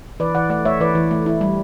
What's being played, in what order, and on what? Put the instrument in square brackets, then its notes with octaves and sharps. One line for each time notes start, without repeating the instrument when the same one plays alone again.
[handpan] E3 B4 D5
E3 D5 F#5
A3 D5 F#5
A3 C#5 E5
E3 B4 D5
E3
A3
E4
G3